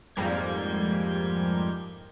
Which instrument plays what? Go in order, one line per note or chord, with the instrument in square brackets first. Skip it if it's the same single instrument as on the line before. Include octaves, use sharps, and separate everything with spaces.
[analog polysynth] F2 G#2 G3 A#3 G6 G#6